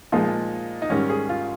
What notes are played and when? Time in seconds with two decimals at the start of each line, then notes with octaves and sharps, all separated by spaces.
0.12 A#2 F3 G#3 D#4
0.82 D#4
0.90 G#2 D#3 G3 C#4
1.10 G#4
1.29 F4